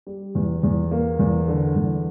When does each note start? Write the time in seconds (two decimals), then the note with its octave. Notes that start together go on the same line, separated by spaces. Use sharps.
0.07 G3
0.35 E2
0.63 E2
0.91 A#3
1.19 E2
1.48 D3
1.76 E2